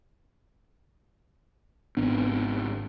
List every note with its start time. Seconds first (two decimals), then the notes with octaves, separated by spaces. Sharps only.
1.97 G#1 B3 D4